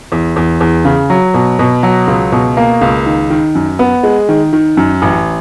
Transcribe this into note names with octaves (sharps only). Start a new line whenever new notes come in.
E2
E2
E2
C#3
F#3
B2
B2
F#3
C#2
B2
A#3
C#2
D#3
D#3
F#2
B3
G#3
D#3
D#3
F#2
A1